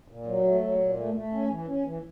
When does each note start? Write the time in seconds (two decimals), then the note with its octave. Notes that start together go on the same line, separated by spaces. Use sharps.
0.08 A#2
0.26 F#3
0.44 A3
0.61 F#3
0.78 A#2
0.97 A3
1.14 A3
1.33 C#4
1.50 E3
1.67 C#4
1.85 E3